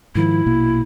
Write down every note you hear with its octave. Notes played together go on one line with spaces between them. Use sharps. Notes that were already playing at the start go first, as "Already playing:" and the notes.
G#2 D#3 F3 E4
A#1 B2 A#3